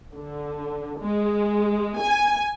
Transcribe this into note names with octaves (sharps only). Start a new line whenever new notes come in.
D3
G#3
G#5